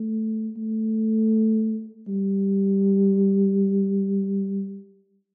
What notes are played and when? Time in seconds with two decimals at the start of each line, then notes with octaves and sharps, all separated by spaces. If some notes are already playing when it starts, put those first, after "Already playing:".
Already playing: A3
0.57 A3
2.08 G3